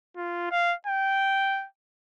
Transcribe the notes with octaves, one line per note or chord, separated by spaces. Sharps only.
F4
F5
G5